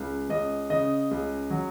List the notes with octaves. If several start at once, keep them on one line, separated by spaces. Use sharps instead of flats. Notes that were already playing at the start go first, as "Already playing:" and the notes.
Already playing: C#2
C#2 D#5
C#3 D#5
C#2
F#3